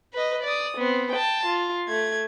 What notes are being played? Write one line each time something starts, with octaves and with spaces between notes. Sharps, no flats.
B4 D#5
D5 D#6
B3 C4
G5 A5
F4
A3 G#6